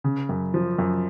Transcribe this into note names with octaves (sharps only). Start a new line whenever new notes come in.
C#3
F#2
F3
F#2